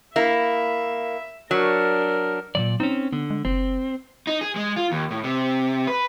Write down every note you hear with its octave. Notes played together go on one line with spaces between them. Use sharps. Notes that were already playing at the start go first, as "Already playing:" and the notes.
A#3 E4 E5
F#3 D4 A#4
A#2 C#3 F#3 D5
C4 C#4 D#4
D3 B3
G#3
F#1 C4
D#4
G#4
G#3
F4
D#2
A2
C3
B4